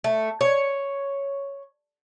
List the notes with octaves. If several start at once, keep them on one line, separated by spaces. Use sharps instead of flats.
A3
C#5